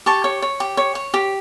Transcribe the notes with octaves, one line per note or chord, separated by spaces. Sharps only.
G4 A5 C#6
C#5
C#5
G4
C#5
C#5
G4